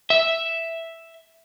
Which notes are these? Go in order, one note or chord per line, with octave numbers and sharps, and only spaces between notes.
E5